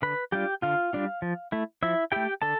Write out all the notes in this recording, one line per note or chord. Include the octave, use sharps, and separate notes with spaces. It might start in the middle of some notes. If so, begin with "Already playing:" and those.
D3 B4 B5
G3 D4 F4 G4 G5
D3 F4 F5
G3 D4 F4
F3
A3 E4
F3 E4 E5
A3 E4 G4 G5
D3 A4 A5